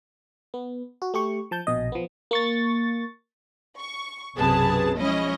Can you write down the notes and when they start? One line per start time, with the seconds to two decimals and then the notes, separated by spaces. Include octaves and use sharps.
0.54 B3
1.02 F#4
1.14 A3 G4 C#6
1.51 F3 A5 G6
1.67 A#1 B2 D#5
1.92 F3 B3
2.31 A#3 C#6 A6
3.76 C#6
4.37 B1 F#2 C3 G#4 B4 A5
4.98 F3 G#3 C#4 E4 D#5